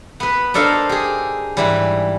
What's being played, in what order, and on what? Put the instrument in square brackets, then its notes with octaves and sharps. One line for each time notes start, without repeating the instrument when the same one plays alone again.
[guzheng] B3 B4
D4 D#4 A4 A#4 C5 F5
G4 G#4
G#2 E3 G3